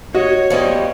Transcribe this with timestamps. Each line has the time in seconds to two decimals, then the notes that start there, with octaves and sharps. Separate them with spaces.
0.15 F#4 C#5 D#5
0.50 E2 F3 G3 B3 D#5